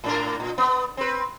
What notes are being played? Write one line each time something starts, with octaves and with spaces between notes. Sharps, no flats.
A2 D4 A#4
A#2
B3
C4 B4